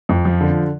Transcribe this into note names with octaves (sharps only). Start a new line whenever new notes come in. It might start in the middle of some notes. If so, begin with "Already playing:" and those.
F2
F3
D3